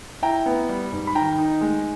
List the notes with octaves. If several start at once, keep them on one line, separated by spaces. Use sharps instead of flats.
E4 G5 A#5
B3
G3
G#2
B5
D#3 G5 A#5
D#4
G#3